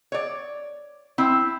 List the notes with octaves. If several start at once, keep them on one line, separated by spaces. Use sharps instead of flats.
C#5 D5
C4 E4